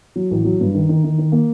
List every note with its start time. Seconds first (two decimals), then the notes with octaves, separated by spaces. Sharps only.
0.16 F#3
0.31 A1
0.45 F#3
0.60 G2
0.75 D#3
0.89 D#3
1.04 D#3
1.18 D#3
1.32 A#3